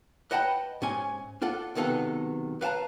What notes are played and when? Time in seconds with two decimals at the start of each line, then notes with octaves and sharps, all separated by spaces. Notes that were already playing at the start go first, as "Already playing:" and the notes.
0.31 B4 D#5 F#5 G5 A5 B5
0.82 G#2 C#4 G#5
1.42 D4 F4 A4 F#5
1.75 B1 C3 D#3 B3 A4 F5
2.61 B4 F5 G5 A5 A#5